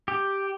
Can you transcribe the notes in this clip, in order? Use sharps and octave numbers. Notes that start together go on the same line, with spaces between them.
G4